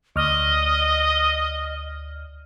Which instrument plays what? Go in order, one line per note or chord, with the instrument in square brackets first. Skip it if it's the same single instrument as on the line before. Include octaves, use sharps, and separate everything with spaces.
[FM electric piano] D2 F6 [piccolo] D#5